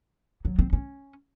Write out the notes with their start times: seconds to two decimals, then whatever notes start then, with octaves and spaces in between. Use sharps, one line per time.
0.45 F#3
0.59 C4
0.73 C#4